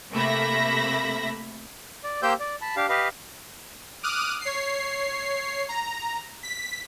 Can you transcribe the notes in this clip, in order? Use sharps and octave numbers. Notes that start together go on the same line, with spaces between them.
C3 A3 A#3 E5 B5 A#6
D5
A#3 G4 C5 G5 E6 G6
D5
A5 B5
D4 G4 F5
G4 B4 D#5 F5
D6 D#6 F6 F#6 D#7
C#5 C7
A#5
B6